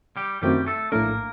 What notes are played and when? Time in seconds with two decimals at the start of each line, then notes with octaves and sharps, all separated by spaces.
0.17 G3 G4
0.42 F#2 D#3 G3 A3 C4 F#4 G4
0.66 A3 A4
0.92 A#1 A2 A3 A#3 D4 A4 A#4